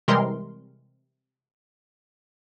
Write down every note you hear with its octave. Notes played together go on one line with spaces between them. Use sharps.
C3 E3 G3 G#3 A#4 C6